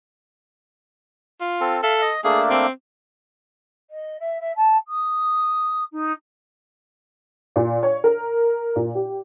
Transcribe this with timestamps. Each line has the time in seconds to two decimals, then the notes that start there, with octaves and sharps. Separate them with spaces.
1.40 F4
1.60 C4 A4
1.83 A4 E5 F5
2.02 D#5
2.24 A3 A#3 D4 G#4
2.50 C4
3.90 D#5
4.20 E5
4.40 E5
4.56 A5
4.87 D#6
5.92 D#4
7.56 A#2
7.83 C#5
8.04 A#4
8.76 A#2
8.95 G4